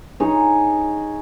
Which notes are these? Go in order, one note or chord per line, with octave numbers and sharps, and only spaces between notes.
D#4 G#4 C#5